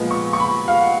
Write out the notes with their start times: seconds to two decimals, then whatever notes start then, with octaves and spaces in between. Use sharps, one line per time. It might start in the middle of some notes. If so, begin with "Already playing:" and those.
Already playing: A#2 F3 G#3 B3
0.11 C#6
0.33 C#6
0.40 B5
0.68 F5
0.81 F#5